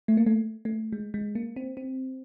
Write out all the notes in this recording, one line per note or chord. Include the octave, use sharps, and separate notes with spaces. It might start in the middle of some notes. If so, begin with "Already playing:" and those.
A3
A#3
A3
A3
G#3
G#3
A#3
C4
C4